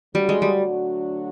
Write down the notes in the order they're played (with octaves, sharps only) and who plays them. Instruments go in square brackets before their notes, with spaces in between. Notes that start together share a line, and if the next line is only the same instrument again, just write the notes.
[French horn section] D3 F#3 A3 D4 F#4 [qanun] G3
[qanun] G#3
G3